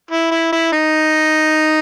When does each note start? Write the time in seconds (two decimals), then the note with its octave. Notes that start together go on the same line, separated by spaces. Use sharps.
0.11 E4
0.31 E4
0.52 E4
0.73 D#4